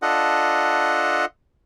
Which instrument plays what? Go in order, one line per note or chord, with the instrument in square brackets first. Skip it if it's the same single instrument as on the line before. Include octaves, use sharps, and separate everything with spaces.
[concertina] D4 F4 A4 D#5 F#5